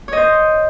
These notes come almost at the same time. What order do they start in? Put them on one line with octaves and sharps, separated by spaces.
C#5 D#5 C5